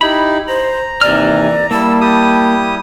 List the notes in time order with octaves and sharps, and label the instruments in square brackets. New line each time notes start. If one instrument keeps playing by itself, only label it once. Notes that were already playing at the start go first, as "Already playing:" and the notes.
[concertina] D#4 E4 [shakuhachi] G4 [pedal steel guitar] B5
[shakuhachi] C5 [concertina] A#5
[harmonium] D#2 C3 G#5 [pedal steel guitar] E3 F6 [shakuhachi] D5
[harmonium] G3 E4 [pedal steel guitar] A#3 [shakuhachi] A5 [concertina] E6
[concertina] G4 D#6